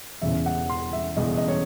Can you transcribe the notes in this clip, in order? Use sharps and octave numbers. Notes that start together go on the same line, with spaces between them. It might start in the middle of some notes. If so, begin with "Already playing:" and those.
E1 E2 C#3 E5
F#5
C6
E5
E1 E2 C#3 D#5
D#5
C#5